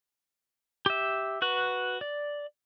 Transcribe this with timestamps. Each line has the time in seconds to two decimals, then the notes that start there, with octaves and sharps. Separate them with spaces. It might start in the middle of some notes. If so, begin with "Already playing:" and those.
0.86 G4 E5
1.42 F#4 B4 F#6
2.01 D5